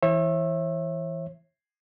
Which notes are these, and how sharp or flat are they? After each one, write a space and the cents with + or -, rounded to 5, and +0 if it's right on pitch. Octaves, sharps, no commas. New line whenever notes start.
E3 +0 C#5 -40 E5 +0